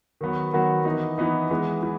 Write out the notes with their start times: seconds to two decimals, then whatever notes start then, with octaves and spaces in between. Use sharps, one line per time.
0.21 D#3 F#3 B3 F#4
0.53 D#3 F#3 B3 F#4
0.85 E3 B3 D#4
1.18 E3 B3 D#4
1.50 E3 G#3 B3
1.83 E3